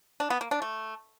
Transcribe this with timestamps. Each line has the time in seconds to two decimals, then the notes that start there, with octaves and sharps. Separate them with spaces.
0.20 D4
0.30 B3
0.41 A#3
0.51 D4
0.62 A3